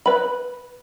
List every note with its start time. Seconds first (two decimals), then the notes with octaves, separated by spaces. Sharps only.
0.06 B4 B5